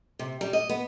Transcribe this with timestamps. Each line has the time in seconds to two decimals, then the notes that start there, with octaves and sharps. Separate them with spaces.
0.19 C3
0.41 G3
0.53 D#5
0.69 B3